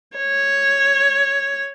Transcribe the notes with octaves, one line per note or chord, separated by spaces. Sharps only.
C#5